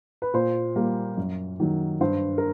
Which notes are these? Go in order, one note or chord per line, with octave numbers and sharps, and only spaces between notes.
B4
A#2 C5
G3 A#3
F#2
D#3 F#3
G2 C5
A#4